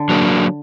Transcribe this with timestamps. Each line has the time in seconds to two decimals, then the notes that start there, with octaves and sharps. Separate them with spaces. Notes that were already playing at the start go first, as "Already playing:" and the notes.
Already playing: D3
0.09 F#3 A#3 D4